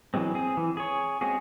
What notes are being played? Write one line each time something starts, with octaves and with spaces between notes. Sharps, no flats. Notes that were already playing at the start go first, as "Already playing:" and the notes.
E3 F#3 G#3 C4
C4 G#4
E3
G#4 C#5
G#3 C4 C#4 F#4 G#4